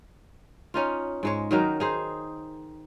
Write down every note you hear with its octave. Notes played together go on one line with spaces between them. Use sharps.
C#4 D#4 F4
G#2 G#3 C#5
D#3 F#3 D#4 A#4
D#4 G#4 C5